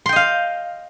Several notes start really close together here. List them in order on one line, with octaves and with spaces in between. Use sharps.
C6 G5 D#5 F5